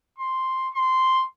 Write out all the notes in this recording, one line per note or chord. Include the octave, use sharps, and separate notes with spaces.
C6
C6